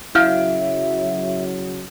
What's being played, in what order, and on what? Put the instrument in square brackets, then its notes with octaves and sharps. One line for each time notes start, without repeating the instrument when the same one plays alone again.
[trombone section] C#3 F#3 [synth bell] E4 [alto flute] E5 [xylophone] F5 F6 G6